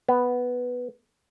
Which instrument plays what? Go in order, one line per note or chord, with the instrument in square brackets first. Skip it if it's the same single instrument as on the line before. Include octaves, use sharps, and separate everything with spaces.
[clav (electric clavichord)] B3